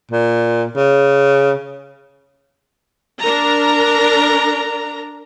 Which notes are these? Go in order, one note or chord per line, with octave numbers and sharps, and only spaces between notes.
A#2
C#3
D4 A#4 A#5